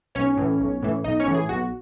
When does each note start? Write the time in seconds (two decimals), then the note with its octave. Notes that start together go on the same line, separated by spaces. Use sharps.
0.15 B1 C#4 C#5
0.37 A2 E3
0.60 B1
0.82 A2 E3
1.04 B1 D#4 D#5
1.20 C#4 C#5
1.26 A2 E3
1.35 G#4
1.49 B1 F#4